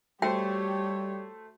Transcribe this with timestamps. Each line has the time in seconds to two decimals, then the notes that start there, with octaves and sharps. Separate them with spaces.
0.22 G3 A3 F#4 G4 C5 C#5 G5